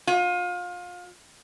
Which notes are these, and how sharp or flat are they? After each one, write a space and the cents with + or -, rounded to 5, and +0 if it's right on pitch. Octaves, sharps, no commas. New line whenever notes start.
F4 +30